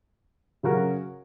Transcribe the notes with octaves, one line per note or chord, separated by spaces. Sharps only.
C#3 F#3 C#4 F#4 A#4